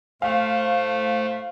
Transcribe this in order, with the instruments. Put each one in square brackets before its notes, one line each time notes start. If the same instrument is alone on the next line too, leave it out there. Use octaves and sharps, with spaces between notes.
[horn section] A2 C5 [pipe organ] A3 [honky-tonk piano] F5